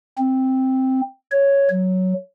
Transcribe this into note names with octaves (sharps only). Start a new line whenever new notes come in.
C4
C#5
F#3